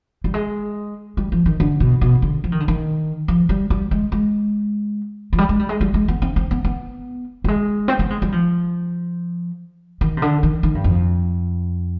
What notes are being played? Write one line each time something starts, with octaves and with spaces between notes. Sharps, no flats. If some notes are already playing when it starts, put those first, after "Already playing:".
G3
G#3
G3
F3
D#3
D3
B2
B2
D3
F3
D#3
D3
D#3
F3
G3
G3
G#3
G#3
F3
G3
G#3
G3
G#3
G3
G#3
B3
C4
C4
B3
B3
G3
G#3
C4
B3
G#3
G3
F3
D#3
C3
D3
D#3
D#3
G2
F2